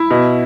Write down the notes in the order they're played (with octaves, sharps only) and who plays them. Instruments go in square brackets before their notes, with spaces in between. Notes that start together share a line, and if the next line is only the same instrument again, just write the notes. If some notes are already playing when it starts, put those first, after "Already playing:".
Already playing: [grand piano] E4
B2